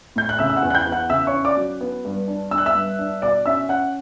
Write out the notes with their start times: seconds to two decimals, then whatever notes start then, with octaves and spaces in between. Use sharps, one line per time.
0.16 A2 G6
0.29 F#6
0.39 C#3 E5 E6
0.50 E6
0.57 F#5 F#6
0.62 E2
0.70 F#6
0.75 G5 G6
0.87 E2
0.92 F#5 F#6
1.10 C#3 E5 E6
1.27 C#5 C#6
1.33 C#4
1.45 D5 D6
1.57 F#3
1.81 B3
2.05 G2
2.28 D4
2.51 D4 E6
2.58 F#6
2.66 E5 E6
2.75 G2
2.99 D4
3.22 B2 D5 D6
3.46 C#4 E5 E6
3.69 C#4 F#5 F#6